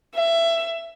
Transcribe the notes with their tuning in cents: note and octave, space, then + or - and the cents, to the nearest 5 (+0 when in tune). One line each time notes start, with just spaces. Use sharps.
E5 +20